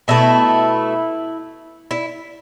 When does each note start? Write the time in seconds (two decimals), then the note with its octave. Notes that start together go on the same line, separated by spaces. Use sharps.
0.08 B2 A3 E4
1.91 E4